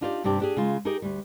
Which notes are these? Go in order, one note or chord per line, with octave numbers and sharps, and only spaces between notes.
D4 D#4 F4 G4 B4 D5
G2 C3 C4 D4 G4
D4 G4 G#4
C#3 G#3 F4
D#4 G4 G#4 A#4 D#5
D2 G3